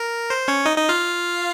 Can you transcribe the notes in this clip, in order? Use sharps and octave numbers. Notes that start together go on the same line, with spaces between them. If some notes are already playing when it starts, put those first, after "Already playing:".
Already playing: A#4
C5
C#4 C#5
D#4 D#5
D#4 D#5
F4 F5